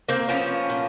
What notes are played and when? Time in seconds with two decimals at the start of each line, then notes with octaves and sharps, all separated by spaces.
0.09 A#3 C4
0.28 F3 B3 C#4
0.69 A#2